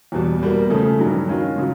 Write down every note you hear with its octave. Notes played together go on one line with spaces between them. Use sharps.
E2 B2 G3
B2 G3 A#3
C#3 F3 A3
G2 D#3 F#3
D#3 G#3 C#4 F4
C#3 F#3